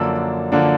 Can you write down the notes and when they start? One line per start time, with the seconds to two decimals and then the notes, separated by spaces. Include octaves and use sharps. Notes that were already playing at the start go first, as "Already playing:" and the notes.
Already playing: F#2 D3 F3 A#3 D4 E6
0.52 D3 F3 A#3 D4